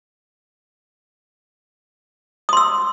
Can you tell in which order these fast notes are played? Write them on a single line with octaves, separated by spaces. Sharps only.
D#6 C6 E6